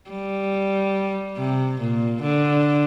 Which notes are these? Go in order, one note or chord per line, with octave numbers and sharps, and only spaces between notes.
G3
C3
A#2
D3